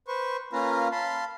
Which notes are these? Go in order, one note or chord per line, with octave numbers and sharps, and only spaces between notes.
B4 C5 C#6
A#3 C#4 F4 B4 F5 A#5
F5 A5 B5 C6